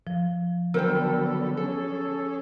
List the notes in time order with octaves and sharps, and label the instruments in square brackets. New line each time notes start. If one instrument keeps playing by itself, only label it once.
[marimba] F3
[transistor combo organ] D3 F#3 B3 [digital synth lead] A4 [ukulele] A#4 C5 G5
[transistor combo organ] C#4 G#4 [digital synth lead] A4